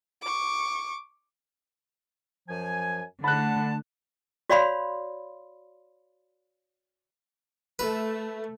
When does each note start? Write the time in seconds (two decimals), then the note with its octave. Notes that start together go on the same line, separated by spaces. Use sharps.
0.22 C#6 D6
2.48 F#2 F3 G#5
3.24 D3 A3 F#5 A5 B5 F#6
4.50 F#4 C#5 D5 F5 B5 C6
7.79 A3 B4